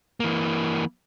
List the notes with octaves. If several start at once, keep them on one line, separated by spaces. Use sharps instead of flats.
E3 A#3